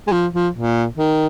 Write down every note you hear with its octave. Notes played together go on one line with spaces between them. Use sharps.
G#3
F3
F3
A#2
D#3